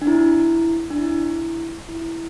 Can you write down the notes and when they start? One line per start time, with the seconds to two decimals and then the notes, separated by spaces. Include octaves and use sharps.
0.02 D4
0.07 E4
0.90 D4
0.98 E4
1.89 E4